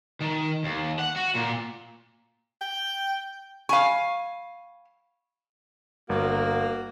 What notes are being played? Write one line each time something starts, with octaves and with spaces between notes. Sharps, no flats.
D#3
D#2
F#5
F#4
A#2
G5
F5 G#5 B5 C#6
G1 A#3 F#4